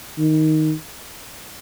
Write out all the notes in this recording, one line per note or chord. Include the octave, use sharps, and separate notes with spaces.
D#3